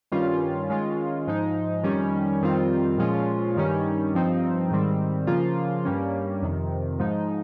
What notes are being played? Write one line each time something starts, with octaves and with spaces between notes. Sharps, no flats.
G2 D#3 G3 C#4 F4
D#3 G#3 C#4 F4
G#2 F3 G#3 D#4
F2 D#3 G3 C#4
F2 D#3 G3 C4 F4
A#2 F3 G#3 C#4 F4
G2 D#3 G3 C#4
G2 F3 C4 D#4
G#2 D#3 G3 C4
C#3 F3 A#3 F4
G2 G3 A#3 C#4
F2 C3 D#3
G#2 F3 G#3 D#4